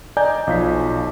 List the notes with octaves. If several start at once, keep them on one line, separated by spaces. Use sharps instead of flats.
D5 D#5 G#5 A#5 G6
B1 F3 B6